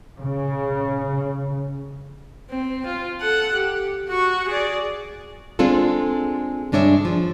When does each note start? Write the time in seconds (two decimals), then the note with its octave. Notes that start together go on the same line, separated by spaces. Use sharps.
0.18 C#3
2.50 C4
2.86 F4
3.21 A4 F#5
3.55 G4
4.09 F#4 C#6
4.48 G#4 D5
5.59 G#3 C4 D4 F4 A4
6.72 G2 G#3 D4 C#5 E5
7.05 F3